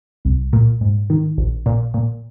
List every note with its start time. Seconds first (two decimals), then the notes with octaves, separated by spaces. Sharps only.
0.25 C2
0.53 A#2
0.81 G#2
1.10 D#3
1.38 A#1
1.66 A#2
1.94 A#2